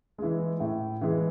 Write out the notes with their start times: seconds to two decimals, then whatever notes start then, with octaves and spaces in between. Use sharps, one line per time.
0.18 E3 G#3
0.60 A2
1.01 E3 G#3